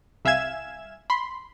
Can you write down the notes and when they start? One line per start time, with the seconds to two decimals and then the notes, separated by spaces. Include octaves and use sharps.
0.25 C2 E5 F5 G#5 G#6 E7
1.10 B5 C6